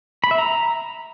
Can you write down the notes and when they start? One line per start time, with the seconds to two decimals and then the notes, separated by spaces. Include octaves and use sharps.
0.24 B5
0.31 E5
0.38 A#5